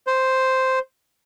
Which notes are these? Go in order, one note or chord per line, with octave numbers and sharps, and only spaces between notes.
C5